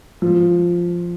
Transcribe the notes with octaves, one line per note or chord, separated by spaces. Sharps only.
F3